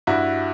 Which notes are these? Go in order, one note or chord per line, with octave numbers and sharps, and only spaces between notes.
G2 E4 F#4